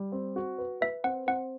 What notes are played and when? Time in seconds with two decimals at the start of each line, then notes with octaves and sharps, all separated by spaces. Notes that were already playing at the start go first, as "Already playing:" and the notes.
Already playing: G3
0.12 C4
0.36 F#4
0.58 B4
0.81 B4 E5
1.04 C4 F#5
1.27 C4 F#5